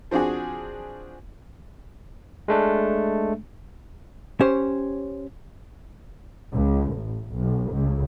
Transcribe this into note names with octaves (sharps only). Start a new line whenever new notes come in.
F3 C4 D4 F#4 G#4
G#3 A3 D4
C#4 G4 C5 C#5
C#2
A1
B1
C#2